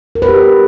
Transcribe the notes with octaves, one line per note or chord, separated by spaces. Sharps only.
A#4
B4
G4